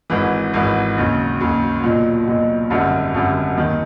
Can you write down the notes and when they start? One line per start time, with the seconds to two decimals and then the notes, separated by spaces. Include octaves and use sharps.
0.10 G#1 G#2 E3
0.53 G#1 G#2 E3
0.97 D#2 C#3 F#3
1.40 D#2 C#3 F#3
1.83 B1 A#2 F#3
2.28 B1 A#2 F#3
2.70 G#1 F#2 D3 G3
3.14 G#1 F#2 D3 G3
3.57 D#2 D#3 F#3